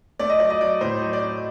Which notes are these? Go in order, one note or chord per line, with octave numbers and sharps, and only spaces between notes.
A3 D5
D#5
F#3 D5
D#5
F#3 D5
A2 C5
F#3
D5
F#3